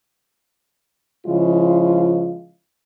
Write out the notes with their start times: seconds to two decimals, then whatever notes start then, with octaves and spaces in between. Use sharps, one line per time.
1.27 C#3 F3 G#3 E4 F4